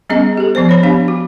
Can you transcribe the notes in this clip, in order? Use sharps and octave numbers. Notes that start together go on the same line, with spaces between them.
G3 B3 C#4 G#4 D#5
G4 A4
F3 B3 C5
C#5 B5
B3 D4 G4 F5
F#4